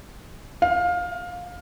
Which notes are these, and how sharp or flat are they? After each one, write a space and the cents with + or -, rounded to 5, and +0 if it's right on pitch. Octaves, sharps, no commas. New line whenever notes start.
F5 +20